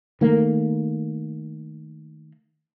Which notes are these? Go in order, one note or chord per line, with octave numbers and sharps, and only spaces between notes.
D#3 A3 A#3